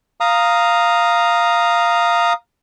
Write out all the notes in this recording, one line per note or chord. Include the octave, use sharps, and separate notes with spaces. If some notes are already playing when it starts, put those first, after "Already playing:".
F5 A#5 D#6